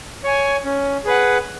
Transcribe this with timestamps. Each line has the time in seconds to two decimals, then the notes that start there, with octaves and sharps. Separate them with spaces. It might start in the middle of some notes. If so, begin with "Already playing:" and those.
0.24 C#5 G#5
0.65 C#4
1.05 G#4 B4 F#5